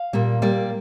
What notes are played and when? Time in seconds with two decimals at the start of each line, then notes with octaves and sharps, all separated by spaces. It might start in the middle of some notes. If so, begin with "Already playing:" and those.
Already playing: F5
0.13 A#2 G3 A#3
0.42 A#2 G3 A#3 D5